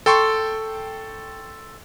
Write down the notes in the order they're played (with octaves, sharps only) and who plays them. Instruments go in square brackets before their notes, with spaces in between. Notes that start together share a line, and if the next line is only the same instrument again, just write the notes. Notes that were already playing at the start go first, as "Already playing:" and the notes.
[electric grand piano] A4 G5 C6 C#6